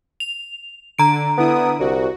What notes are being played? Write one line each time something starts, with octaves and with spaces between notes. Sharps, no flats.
F7
D3 A#5 D7
D3 B3 E4 D#6
C2 F#4